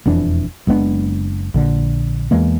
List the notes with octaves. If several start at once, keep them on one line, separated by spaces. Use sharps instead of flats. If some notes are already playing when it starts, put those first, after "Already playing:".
E1 F2 E3 D4
F#1 G#3 B3 D4
A#1 D3
E2 E3 G#3 A#3